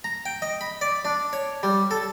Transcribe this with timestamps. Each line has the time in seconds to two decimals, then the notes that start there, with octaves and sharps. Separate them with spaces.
0.04 A#5
0.26 G5
0.42 D#5
0.61 B5
0.81 D5
1.05 D4
1.33 C#5
1.63 G3
1.91 A4